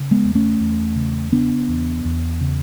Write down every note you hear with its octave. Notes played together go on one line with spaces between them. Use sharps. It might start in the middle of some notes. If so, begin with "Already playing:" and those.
Already playing: C#3
G#3 B3
E2
A3 C#4
E2
C#3
C#3 B3 D4
E2
E2
C#3